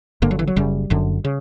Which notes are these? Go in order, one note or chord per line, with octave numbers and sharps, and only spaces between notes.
G1 G2 D3 A#3
F#3
E3
F#3
F#1 F#2 C#3 G3
F#1 F#2 D3
C#3